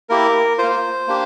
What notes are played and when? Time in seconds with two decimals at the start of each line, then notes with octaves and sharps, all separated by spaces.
0.09 A#3 E4 G4 A#4
0.58 A#3 F4 C5
1.07 A#3 D4 G4